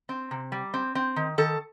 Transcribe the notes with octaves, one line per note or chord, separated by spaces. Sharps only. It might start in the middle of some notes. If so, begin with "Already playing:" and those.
C4
C3
G3
C4
C4
D#3
D#3 A4